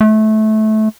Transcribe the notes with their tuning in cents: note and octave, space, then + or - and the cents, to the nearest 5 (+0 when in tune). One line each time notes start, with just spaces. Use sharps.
A3 -20